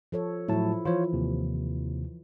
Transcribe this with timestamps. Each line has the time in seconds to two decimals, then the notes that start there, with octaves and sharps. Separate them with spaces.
0.12 F3 A4 C#5
0.48 A2 F3 F#3 E4 A5
0.85 E3 F3 F4 C5 C#5
1.13 D#2 C3